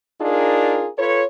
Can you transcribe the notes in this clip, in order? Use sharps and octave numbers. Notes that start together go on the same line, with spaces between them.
D4 D#4 F4 G#4 A#4
F4 A4 B4 C#5